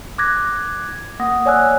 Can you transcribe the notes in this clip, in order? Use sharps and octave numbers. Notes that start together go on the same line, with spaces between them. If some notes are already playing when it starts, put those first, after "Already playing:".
D6 F#6 G#6 A#6
A#3 F#5 D#6 A#6
C#5 D5 G#5 E6 F#6